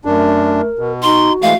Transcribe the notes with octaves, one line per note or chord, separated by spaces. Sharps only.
F#2 A3 D4 A#4
B2
D#4 F#4 C6
E3 G#3 A3 F5